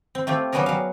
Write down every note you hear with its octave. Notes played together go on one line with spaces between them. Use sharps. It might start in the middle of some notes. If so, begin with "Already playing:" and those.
C4
A3 C4 F4 G4
F#3 G3 B3 C#4 G#4 A#4
F#3 F5